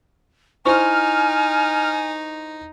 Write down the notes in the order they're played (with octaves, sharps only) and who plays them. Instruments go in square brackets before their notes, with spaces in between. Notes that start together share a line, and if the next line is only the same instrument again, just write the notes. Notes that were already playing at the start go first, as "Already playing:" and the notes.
[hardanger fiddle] D#4 [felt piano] E4 C5 C#6 [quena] G#5 [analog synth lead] F6